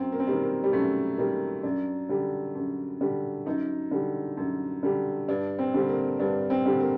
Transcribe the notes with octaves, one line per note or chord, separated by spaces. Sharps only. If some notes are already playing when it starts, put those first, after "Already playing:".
Already playing: F#2 C4
A#3
C4
D#3 G3 A#3
A#3
G3
F#2 A3
D#3 G3 A#3
F#2 D4
D3 G3
F#2
D3 G3
F#2 D#4
D3 G3
F#2
D3 G3
G2 D4
C4
D3 G3 C4
A#3
G2 D4
C4
D3 G3
A#3